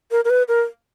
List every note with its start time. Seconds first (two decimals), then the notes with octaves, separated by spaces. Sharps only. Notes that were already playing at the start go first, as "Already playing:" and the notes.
0.11 A#4
0.25 A#4
0.30 B4
0.48 A#4